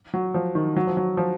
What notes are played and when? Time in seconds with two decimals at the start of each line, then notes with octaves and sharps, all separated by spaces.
0.14 F#3
0.34 F3
0.55 D#3
0.76 F#3
0.87 F3
0.97 F#3
1.17 F3